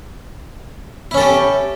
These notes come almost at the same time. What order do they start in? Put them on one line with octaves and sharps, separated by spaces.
E4 C#4 A4 G4